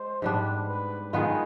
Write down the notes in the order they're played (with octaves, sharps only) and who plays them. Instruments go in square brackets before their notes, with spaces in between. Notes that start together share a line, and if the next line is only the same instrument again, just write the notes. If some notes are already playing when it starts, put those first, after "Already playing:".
Already playing: [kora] G#3 [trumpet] C5
[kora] G#2 G3 B3 D4
[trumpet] B4
[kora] D#3 G#3 B3 F4 [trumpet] G#4